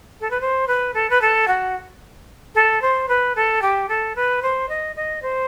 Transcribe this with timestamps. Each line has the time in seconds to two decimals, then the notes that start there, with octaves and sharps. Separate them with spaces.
0.20 A4
0.30 B4
0.41 C5
0.67 B4
0.94 A4
1.10 B4
1.21 A4
1.48 F#4
2.55 A4
2.82 C5
3.08 B4
3.35 A4
3.62 G4
3.89 A4
4.15 B4
4.42 C5
4.69 D#5
4.96 D#5
5.22 C5